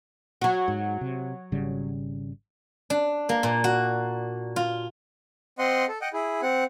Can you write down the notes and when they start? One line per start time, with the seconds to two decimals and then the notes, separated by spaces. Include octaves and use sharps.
0.41 F#3 F#4
0.68 G#2
1.01 C3
1.52 G#1 C#3 G3
2.90 D4
3.29 A#3
3.43 A#2
3.64 F#4
4.56 F4
5.59 C4 D#5 F#5 C6
5.88 A4
6.01 D#5 F#5 G5
6.13 E4 G#4
6.42 C4 F#5